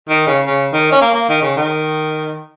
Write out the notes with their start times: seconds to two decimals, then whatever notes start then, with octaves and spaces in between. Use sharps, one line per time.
0.09 D#3
0.27 C#3
0.46 C#3
0.73 D#3
0.92 C#4
1.01 A#3
1.14 A#3
1.29 D#3
1.42 C#3
1.57 D#3